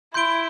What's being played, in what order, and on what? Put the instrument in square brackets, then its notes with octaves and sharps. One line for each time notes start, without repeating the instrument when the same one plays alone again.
[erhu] E4 [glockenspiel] C6 G6 D7 G7